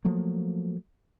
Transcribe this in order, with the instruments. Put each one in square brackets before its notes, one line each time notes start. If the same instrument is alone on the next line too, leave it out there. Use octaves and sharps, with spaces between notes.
[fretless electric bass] F3 F#3 A3 A#3